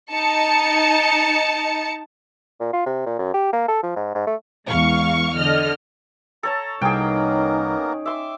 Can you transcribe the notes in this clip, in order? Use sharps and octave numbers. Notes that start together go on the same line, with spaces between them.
D#4 A5 C#7
A#2
F4
C3
A#2
F#2
G4
A#3
A4
F3
G#2
G#2
A3
E2 G#3 F5 C#6
D3 D#5 F6
A4 C#5 A5 A#5
C2 A#3 B3 C#4 D#4 G#4 A#4 G5
E5 C6 D6